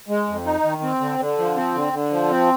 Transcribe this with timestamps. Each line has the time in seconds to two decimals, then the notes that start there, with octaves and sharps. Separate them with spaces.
0.08 G#3
0.28 F2
0.45 D#4
0.64 D#3
0.83 C4
1.00 D3
1.19 D3
1.38 F3
1.56 C4
1.74 D3
1.93 D3
2.11 F3
2.30 C4